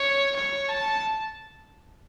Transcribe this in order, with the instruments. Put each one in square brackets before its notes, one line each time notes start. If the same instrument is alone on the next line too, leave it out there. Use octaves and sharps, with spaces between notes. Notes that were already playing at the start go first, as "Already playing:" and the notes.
Already playing: [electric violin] C#5
C#5
A5